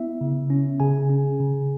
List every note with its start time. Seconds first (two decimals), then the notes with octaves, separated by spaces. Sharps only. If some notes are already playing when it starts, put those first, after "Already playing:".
Already playing: B3 E4 E5
0.21 C#3
0.50 C#4
0.80 C#3 G#4 G#5
1.10 C#4
1.40 C#3